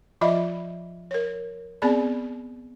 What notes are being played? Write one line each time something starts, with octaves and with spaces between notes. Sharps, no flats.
F3 F4 D#5 E5 B5
A#4 C#5
B3 C4 G#4 D5 B5